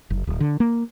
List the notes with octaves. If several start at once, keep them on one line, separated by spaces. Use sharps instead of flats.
F#1
D1
D3
A#3